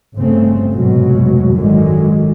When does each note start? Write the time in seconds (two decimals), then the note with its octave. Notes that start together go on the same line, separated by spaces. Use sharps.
0.15 G1 C#3 A3 C4
0.73 F1 A#1 F2 G#2 B2 F#3
1.51 G#1 F#2 D3 D#3 F#3 G#3